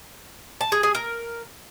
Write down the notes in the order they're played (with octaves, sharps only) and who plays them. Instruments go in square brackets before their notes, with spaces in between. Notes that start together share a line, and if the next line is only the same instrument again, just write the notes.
[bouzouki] A5
G#4
G#4
A#4